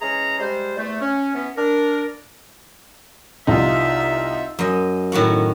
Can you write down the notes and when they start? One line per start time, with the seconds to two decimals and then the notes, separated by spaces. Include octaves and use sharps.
0.01 E3 G#3 C#4 G#4 A#5
0.39 G3 G#3 C5
0.77 E2 A3
1.01 C#4
1.34 E3 B3 C#4
1.57 D4 A#4
3.47 C2 C3 D#4 F4 E5
4.59 F#2 D#5
5.12 A2 D#3 F#4 F#5